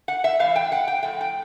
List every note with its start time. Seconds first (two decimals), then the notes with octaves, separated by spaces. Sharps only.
0.08 F#5
0.24 E5
0.40 A2 E3 A3 F5
0.56 G5
0.72 F#5
0.88 G5
1.03 A2 F3 A3 G5
1.21 G5